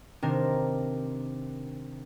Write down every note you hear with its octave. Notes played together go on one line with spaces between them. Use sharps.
C3 D#3 C4 D4 A#4